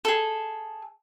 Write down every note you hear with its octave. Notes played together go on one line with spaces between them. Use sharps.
G#4 A4